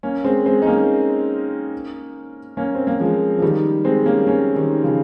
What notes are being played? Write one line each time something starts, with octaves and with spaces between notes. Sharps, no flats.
A#3 C#4
G#3 C4
G#3 C4
D#4
A#3 C#4
A#3 C#4
C4
A#3
F3 G#3
F3
D#3 G3
G#3 C4
A#3 C#4
A#3 C#4
D#3 G3
C#3 F3